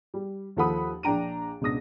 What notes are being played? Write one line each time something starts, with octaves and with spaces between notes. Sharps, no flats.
G3
D#2 F3 A4 F#5 B5 D#6
A#1 D4 G5 A#5 D7 D#7
C#2 B2 D4 D#6 A#6